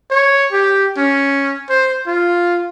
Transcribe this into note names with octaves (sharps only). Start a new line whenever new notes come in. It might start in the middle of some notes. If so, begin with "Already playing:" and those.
C#5
G4
C#4
C5
F4